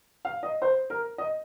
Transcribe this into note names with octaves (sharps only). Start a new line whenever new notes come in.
F5
D#5
C5
A#4
D#5